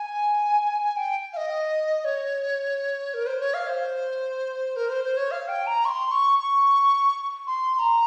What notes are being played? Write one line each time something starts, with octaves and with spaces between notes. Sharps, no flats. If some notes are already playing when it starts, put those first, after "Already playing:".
Already playing: G#5
G5
F5
D#5
C#5
A#4
C5
C#5
F5
C5
A#4
C5
C5
C#5
F5
G5
A#5
C#6
C6
C#6
C#6
C6
C6
A#5